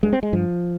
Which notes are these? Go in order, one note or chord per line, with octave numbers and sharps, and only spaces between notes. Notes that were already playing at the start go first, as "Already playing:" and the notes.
G2 G#3
C4
G#3
G2 F3